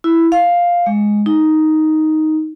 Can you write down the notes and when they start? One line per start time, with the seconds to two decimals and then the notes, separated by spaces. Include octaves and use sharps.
0.04 E4
0.32 F5
0.86 G#3
1.26 D#4